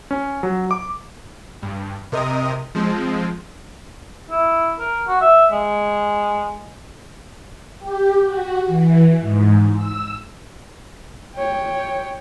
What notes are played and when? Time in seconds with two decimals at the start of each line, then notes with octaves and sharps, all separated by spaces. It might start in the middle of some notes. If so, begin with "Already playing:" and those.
0.11 C#4
0.43 F#3
0.71 D6
1.62 G2
2.12 C3 A#4 D#5 D#6
2.75 F3 G#3 C4
4.30 E4
4.80 A#4
5.08 F#4
5.21 E5
5.52 G#3
7.78 G4
8.23 F#4
8.67 E3
9.20 G#2
9.74 E6
11.36 C#5 G5